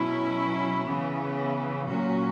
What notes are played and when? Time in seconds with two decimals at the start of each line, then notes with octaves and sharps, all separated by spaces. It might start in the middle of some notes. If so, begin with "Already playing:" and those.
Already playing: B2 F#3 C#4 E4
0.83 C#3 E3 B3
1.86 A#2 F#3 C#4 F#4